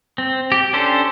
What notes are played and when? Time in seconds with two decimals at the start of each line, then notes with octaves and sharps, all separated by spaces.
0.18 C4
0.52 G4
0.73 C#4 D4 G4 A4 C5